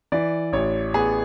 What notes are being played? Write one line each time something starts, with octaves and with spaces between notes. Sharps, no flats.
E3 D5
A1 C#5
B3 G#4